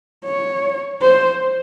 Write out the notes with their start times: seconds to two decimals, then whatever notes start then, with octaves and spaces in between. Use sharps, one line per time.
0.24 C#5
1.01 C5